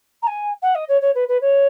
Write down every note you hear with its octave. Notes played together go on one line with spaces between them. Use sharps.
A#5
G#5
F#5
D#5
C#5
C#5
B4
B4
C#5